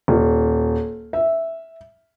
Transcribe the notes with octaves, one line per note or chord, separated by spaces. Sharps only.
D#1
E5